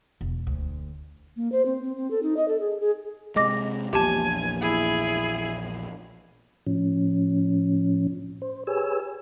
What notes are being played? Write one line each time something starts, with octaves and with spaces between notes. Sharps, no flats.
E1
D2
A#3
C5
C4
C4
C4
A4
D#4
D#5
A4
G#4
G#4
C3 G#3 D#5 D6 A#6
A#1 E2 A#2 G4 G#5 A5
E4 G#4
A2 F3 C#4
C5
G4 G#4 B4 C#5 G#5 E6